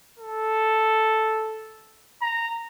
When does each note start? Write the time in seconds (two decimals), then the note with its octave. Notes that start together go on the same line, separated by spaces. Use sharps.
0.19 A4
2.22 A#5